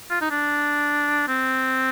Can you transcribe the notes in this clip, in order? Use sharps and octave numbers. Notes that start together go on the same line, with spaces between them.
F4
D#4
D4
C4